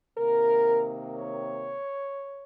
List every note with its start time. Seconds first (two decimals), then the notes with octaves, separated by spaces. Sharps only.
0.15 C3 D#3 A#3 A#4
1.17 C#5